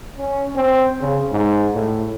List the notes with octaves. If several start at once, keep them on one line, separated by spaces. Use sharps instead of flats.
C#4
C4
C#3
G#2
A2